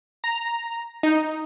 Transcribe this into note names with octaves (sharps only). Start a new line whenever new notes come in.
A#5
D#4